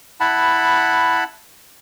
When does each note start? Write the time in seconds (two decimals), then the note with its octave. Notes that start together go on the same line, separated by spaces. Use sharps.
0.20 E4 F#5 A5 B5